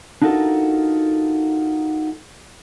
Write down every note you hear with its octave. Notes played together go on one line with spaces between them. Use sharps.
D4 D#4 F4 F#4 A4 A#4